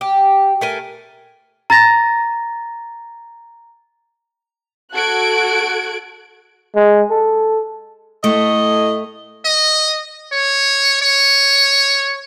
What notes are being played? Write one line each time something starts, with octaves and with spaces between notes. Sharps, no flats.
G4
A3 A#4 G#5
A#5 A6 A#6
F#4 A4 F#6 G#6 D7
G#3
A4
A2 A3 D#5
D#5
C#5
C#5